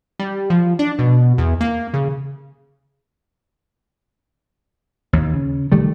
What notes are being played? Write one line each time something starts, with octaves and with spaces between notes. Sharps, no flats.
G3
F3
D4
B2
E2
A#3
C#3
D#2
C#3
D#3 G3 A3